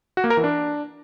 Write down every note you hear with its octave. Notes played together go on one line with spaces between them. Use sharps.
F#4
A#3
A#4
E3
D4